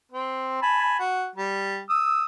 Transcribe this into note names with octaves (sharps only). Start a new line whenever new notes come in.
C4
G#5 A5 B5
F#4
G3
D#6 E6